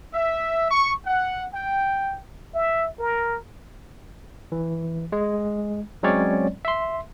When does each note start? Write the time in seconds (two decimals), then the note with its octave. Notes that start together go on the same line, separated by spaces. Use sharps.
0.14 E5
0.70 C#6
1.04 F#5
1.52 G5
2.54 E5
2.99 A#4
4.52 E3
5.12 G#3
6.03 F#3 G#3 C4 C#4 C#5 D5
6.65 E5 C6